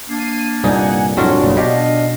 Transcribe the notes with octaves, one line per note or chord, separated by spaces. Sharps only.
A#3 D4 C7 D#7
C2 G2 A#2 D#4 F#5 G#5
C2 F2 A2 F#3 C#4 D4 F4
F#1 B1 A#2 C#3 G3
B2 G4 D#5 F5